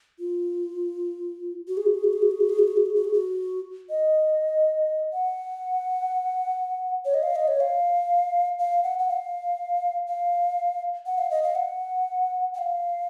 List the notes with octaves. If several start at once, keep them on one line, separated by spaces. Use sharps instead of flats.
F4
F#4
G#4
F#4
G#4
F#4
G#4
F#4
G#4
F#4
G#4
F#4
G#4
F#4
G#4
F#4
G#4
F#4
D#5
F#5
C#5
D#5
F5
D#5
C#5
F5
F5
F#5
F#5
F5
F5
F#5
F5
D#5
F5
F#5
F#5
F5